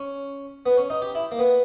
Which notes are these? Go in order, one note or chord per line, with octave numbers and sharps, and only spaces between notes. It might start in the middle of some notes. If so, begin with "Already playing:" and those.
Already playing: C#4
B3
C#4
D#4
G4
E4
A#3
B3